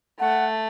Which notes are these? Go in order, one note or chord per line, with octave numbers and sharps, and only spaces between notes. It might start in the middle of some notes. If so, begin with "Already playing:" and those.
A3 F#5